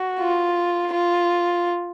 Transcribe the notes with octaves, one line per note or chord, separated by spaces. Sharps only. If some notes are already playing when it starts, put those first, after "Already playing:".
Already playing: F#4
F4
F4